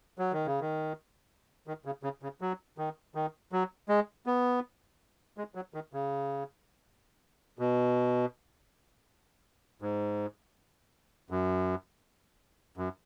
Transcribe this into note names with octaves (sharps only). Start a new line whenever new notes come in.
F#3
D#3
C#3
D#3
D#3
C#3
C#3
C#3
F#3
D#3
D#3
F#3
G#3
B3
G#3
F#3
D#3
C#3
B2
G#2
F#2
F#2